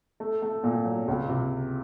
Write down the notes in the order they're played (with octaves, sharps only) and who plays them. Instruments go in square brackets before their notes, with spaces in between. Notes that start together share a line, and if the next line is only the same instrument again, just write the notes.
[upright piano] A3
A3
A#2
F#3
C#2
C3